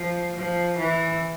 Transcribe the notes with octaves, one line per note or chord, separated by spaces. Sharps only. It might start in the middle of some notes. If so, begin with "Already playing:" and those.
Already playing: F3
F3
E3